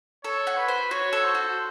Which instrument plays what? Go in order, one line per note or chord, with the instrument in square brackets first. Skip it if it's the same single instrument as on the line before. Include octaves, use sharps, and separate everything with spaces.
[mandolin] A4 [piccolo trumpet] C#5
[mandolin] F#4
[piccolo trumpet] B4
[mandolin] C5
[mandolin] F#4 [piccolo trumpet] C#5
[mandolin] A4
[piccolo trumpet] C5
[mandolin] F#4